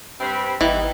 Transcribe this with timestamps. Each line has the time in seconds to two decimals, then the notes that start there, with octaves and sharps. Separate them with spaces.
0.20 G2 C4 B5
0.61 G#1 E3 G3 B3 D#4 D#5 G5